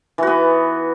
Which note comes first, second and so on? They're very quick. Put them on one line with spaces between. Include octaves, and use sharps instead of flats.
E3 F#4 B3